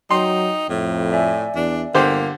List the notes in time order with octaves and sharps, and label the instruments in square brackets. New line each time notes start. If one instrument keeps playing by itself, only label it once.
[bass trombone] F#3 [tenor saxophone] D#4 [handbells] G5 [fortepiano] C6
[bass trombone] F2 [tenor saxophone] A2
[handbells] D5 E5 G#5
[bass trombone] E2 [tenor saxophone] D4
[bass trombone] G1 [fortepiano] D3 G4 C5 [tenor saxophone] A#3